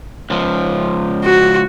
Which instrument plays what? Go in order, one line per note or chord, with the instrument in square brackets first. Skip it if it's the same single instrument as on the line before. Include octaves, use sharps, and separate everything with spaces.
[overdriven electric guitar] C#2 F3
[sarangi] F#4